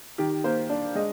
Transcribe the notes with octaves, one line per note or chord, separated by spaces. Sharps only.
D#3 G4
A#3 C5
D4
G#3 D#5